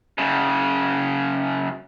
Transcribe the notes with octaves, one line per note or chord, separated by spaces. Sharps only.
F#2 C#3